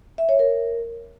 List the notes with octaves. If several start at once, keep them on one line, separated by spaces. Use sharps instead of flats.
E5
C#5
A#4